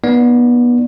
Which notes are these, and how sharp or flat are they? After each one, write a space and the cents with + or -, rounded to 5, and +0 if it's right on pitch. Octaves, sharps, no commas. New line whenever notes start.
B3 -25 D#4 +0 D5 +0